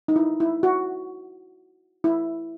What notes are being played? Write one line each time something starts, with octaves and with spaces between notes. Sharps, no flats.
D#4
E4
E4
F#4
E4